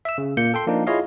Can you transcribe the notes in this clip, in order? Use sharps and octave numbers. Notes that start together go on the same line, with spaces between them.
E5 E6
C#3
A#2 A#3 G6 C#7
A4 G5 C6
F3 A#3 D4 D#4
E4 F4 G#4 C#5 D#5 F5